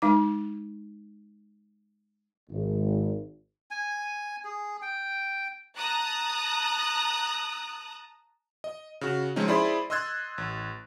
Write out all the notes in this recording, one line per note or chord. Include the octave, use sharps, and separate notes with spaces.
G#3 D#4 D6
G#1
G#5
G#4
G5
A5 A#5 D#6 F#6
D#5
C#3 F#4
F3 G#3 C4 C#4 D#4
E4 G#4 C5 D5 B5 C6
D#5 C6 E6 F#6 G#6 A6
A1